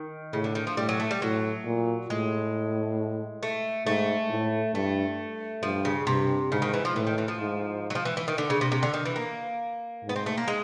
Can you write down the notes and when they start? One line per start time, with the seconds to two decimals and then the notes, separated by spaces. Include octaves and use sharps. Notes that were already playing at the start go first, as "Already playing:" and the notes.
Already playing: D#3
0.33 A2 C#3
0.44 D3
0.55 D#3
0.67 F3
0.77 A2 G3
0.89 F#3
1.00 A3
1.11 G3
1.21 A2 F#3
1.66 A#2
2.10 A2 G#3
3.43 A3
3.86 G#2 A3
4.30 A2
4.74 G2 A3
5.63 G2 F3
5.85 C#3
6.07 G2 C3
6.52 G#2 C#3
6.62 D#3
6.74 E3
6.85 F3
6.95 A2 E3
7.07 D#3
7.18 E3
7.28 F3
7.39 G#2
7.90 F#3
7.95 F3
8.05 E3
8.17 E3
8.28 D#3
8.38 D3
8.50 C#3
8.61 C3
8.72 C3
8.83 D3
8.94 D#3
9.05 E3
9.16 A#3
10.05 G#2 B3
10.16 C4
10.26 A3
10.37 A#3
10.48 G#3